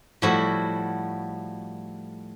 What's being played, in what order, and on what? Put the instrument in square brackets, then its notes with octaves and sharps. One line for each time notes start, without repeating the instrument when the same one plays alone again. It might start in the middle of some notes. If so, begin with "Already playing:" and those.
[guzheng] A2 F3 G3 E4 F#4